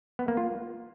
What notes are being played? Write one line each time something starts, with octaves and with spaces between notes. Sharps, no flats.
B3
A#3
F4